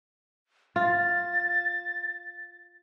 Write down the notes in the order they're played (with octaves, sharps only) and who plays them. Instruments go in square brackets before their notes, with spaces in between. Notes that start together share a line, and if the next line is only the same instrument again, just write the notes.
[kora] F4 [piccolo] A6